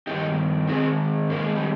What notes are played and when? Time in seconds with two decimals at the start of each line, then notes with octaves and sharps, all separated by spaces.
0.07 G2 D#3 D#4 G4
0.68 G#2 D#3 G#3 C4
1.30 G#2 D#3 A#3
1.43 G#3
1.55 G3